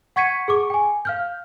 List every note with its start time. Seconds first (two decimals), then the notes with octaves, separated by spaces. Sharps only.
0.16 F#5 C#6 G#6 B6 C#7 D#7
0.48 G#4 C#6 D6
0.70 G5 G#5
1.05 F5 F6 G6